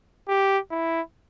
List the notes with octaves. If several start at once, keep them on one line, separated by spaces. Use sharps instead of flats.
G4
E4